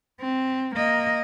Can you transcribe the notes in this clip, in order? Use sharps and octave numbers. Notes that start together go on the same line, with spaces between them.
C4
A#3 D#5